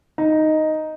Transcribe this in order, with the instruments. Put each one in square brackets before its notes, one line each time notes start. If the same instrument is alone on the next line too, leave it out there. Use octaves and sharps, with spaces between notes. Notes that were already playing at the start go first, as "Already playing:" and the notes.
[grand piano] D#4